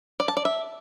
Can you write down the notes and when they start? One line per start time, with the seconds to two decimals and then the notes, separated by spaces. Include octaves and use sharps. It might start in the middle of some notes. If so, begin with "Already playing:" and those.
0.20 D5
0.28 A5
0.37 D5
0.45 E5